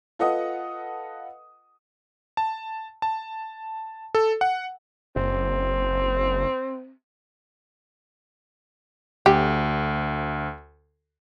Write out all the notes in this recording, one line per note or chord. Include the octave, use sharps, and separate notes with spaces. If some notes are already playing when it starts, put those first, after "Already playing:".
F4 A4 B4 D#5 F#5 D#6
A5
A5
A4
F#5
F#1 C4
D2 G4